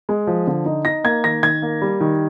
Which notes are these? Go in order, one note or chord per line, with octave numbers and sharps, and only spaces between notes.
G#3
F3
D3
D#4
D#4 A#6
A#3 G#6
D#3 A#6
D#3 G#6
A#3
G3
D#3